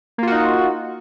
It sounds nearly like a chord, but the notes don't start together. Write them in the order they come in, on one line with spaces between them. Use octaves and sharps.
A#3 F4 F#4 D#4